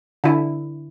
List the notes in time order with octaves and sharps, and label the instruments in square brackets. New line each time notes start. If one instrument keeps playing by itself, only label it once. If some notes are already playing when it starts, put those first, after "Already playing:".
[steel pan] D3 E4